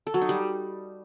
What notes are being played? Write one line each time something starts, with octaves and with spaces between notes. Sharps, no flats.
A4
F#3
D#4
G3